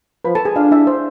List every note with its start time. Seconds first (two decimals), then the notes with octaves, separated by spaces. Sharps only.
0.25 F3 B4 B5
0.35 A4 A5
0.45 G#4 G#5
0.56 D4 F4 F5
0.71 E4 E5
0.87 C5